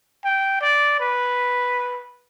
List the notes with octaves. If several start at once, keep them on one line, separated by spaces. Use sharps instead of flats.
G5
D5
B4